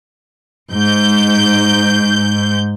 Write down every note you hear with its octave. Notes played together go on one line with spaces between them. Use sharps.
G#2 G6